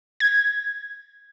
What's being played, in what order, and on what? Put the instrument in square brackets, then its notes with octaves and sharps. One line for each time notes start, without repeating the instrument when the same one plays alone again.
[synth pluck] G#6